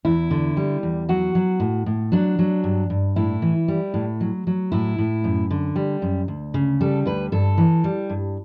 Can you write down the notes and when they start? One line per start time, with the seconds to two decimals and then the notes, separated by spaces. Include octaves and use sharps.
0.05 E2 E4
0.31 D3
0.57 G3
0.83 E2
1.09 F#3 F#4
1.35 F#3
1.60 A2
1.86 A2
2.12 F#3 D4
2.39 F#3
2.64 G2
2.90 G2
3.16 A2 E4
3.42 E3
3.68 G3
3.94 A2
4.21 F#3
4.47 F#3
4.72 A2 E4
4.98 A2
5.24 F#2
5.50 D3
5.76 G3
6.02 F#2
6.28 D2
6.54 C#3
6.81 G3 A4
7.05 D2 B4
7.32 G2 A4
7.58 E3
7.84 G3
8.10 G2